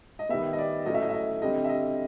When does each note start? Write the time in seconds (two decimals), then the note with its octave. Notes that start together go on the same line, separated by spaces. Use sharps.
0.19 D#5
0.29 D#3 G3 B3 E5
0.53 D#5
0.58 D5
0.85 A2 F#3 A3 C#4 D#5
0.94 E5
1.02 D#5
1.09 E5
1.14 D#5
1.42 D3 G3 C4 D#5
1.65 E5
1.69 D#5